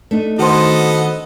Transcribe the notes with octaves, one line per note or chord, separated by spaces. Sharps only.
A3 D4 D#4
D#3 B3 F#4 A4 C5 D#5